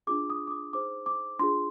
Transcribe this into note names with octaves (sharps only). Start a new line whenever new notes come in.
D4 F4 G#4 D6
D#6
D6
D#6
D#4 G#4 C5 D6
D6
D4 F4 G#4 C6